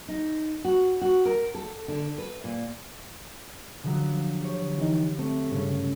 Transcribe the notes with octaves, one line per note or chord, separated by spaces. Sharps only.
D#4
F#4
F#4
A#4
A4
D3
B4
A#2
D3 F3 F#3
G4 C#5
E3 D#4
A3 C4
G2 C#3 C#4